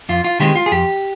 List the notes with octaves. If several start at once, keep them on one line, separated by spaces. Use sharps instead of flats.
F2 F4
F4
D#3 G#3 C4 G4
F4
G#4
F2 G4